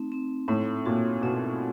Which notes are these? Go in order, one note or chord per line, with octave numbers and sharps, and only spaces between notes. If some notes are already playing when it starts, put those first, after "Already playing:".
Already playing: A3 C4 D#4
C4
A2 C4
A#2 F#4
B2 C4